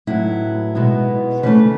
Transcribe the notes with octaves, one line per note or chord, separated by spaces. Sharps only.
A2 F#3 B3 E4
B2 G#3 B3
C#3 E3 A3 B4